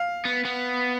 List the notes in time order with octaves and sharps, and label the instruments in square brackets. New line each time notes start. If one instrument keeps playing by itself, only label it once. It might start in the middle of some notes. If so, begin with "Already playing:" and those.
Already playing: [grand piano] F5
[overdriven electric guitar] B3
B3